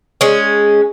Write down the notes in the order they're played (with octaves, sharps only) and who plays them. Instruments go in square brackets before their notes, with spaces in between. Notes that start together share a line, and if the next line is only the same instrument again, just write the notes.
[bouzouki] G#3 C#4